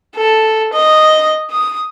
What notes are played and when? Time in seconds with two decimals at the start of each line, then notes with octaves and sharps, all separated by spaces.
0.16 A4
0.73 D#5
1.51 D#6